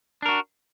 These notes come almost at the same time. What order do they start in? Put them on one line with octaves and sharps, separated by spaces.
D4 A#4 F#4